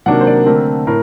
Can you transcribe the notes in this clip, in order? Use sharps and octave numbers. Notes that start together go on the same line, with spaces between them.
C3 D#3 F#3 A#3 D4 F#5
C5
D5
D3 A3 C4 A#4
A2 A#4